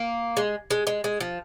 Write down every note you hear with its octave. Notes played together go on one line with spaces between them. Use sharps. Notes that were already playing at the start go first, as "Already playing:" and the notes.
Already playing: A#3
G#3
G#3
G#3
G#3
F3